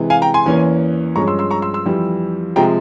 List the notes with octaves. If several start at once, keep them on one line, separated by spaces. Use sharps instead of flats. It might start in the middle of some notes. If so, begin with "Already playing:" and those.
Already playing: C3 E3 G#3
F5 G#5
G5 A#5
G#5 C6
E2 E3 A#3 C#4
G2 F3 G#3 C#4 A#5 C#6
C6 E6
C6 E6
A#5 C#6
C6 E6
C6 E6
F2 E3 G3
C3 F3 G#3 G5 A#5